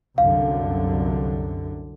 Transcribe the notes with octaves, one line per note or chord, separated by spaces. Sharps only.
C2 F#2 D3 F5